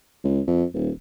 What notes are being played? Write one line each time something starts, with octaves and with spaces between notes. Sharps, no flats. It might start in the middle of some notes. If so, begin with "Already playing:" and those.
C#2
F2
D#1